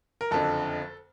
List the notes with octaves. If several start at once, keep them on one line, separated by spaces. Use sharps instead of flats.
A#4
F#1 F2 D3 A4